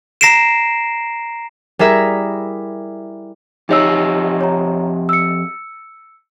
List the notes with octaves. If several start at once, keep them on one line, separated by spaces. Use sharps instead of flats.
A#5 A#6 C7 D7 E7
G3 E4 G#4 A#4 E5
F2 D#4 G4 C#5 D#5 E6
C#5 A#5
E6 C#7